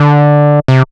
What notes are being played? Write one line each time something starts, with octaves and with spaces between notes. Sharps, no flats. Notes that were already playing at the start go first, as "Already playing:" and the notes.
Already playing: D3
C3